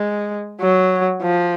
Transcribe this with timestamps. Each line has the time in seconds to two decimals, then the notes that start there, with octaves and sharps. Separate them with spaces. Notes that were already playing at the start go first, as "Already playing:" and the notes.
Already playing: G#3
0.61 F#3
1.22 F3